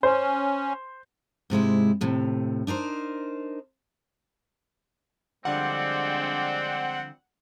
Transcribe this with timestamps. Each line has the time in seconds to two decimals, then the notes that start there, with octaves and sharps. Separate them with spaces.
0.03 C#4 C5
1.50 G#2 C3 G#3 E4
2.01 D#2 A2 C3
2.67 D4 D#4 A#4 C5
5.45 D3 F3 G3 G#3 C4 D4 D5 F#5